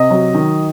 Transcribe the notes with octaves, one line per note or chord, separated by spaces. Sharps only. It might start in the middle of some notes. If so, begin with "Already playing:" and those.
Already playing: C3 D#5
F#3
D#3